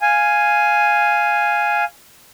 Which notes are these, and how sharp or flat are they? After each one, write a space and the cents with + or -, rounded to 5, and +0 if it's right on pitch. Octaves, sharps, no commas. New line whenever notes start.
F5 +0 G#5 +0